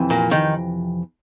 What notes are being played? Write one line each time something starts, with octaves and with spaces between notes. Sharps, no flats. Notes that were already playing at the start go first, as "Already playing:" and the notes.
Already playing: F2 C3 E3
A#2 A#3
D#3 D#4